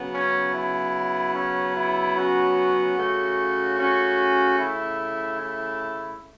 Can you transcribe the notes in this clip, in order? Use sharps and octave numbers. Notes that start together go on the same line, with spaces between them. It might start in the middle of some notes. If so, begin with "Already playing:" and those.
Already playing: C#3 F#3 B3
C#4
E4
C#4
E4
C#4 F#4
C#3 A3
C#4 F#4
E4
E4